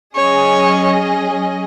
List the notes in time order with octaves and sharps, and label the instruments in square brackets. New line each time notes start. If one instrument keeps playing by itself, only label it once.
[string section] F#3 C#4 G#4 D#5 [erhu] C#5